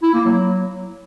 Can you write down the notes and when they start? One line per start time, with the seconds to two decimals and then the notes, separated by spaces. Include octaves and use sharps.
0.03 E4
0.14 A#3
0.25 F#3